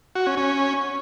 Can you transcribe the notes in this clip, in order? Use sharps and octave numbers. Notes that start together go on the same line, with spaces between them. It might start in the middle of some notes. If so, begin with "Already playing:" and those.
F#4
C#4
C#4